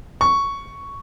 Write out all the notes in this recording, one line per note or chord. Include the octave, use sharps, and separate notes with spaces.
C#6